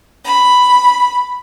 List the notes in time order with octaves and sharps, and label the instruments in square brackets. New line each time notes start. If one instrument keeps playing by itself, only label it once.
[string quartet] B5